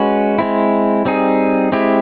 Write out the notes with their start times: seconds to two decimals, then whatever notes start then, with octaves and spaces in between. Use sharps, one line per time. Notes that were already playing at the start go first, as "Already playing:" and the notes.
Already playing: G#3 C#4 F#4 B4
0.38 G#3 C4 E4
1.05 G3 C4 D#4 G#4
1.72 G#3 C4 E4 G4